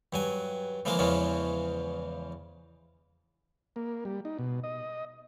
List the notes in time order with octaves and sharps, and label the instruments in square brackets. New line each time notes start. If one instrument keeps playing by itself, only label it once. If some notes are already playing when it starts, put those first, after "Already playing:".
[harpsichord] G2 F#3 G#5
C#3 E3 F3 G#3 A#3 A#4
E2 C#3 E3 F3 G#3 C#4
[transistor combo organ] A#3
G3
D#4
B2
D#5